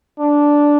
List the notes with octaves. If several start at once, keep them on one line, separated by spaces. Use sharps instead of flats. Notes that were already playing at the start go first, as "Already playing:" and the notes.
D4